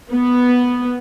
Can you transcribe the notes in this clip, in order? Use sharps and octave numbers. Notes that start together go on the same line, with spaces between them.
B3